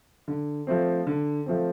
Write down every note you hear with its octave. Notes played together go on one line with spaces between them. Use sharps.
D3
F3 A3 C4
D3
F3 A3 C4